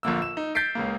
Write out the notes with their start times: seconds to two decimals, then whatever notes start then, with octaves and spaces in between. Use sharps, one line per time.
0.03 A#1 D3 A#3 E6
0.22 E7
0.37 D#4
0.55 G6 A6 B6 C7 D7
0.75 C#2 C#3 A#3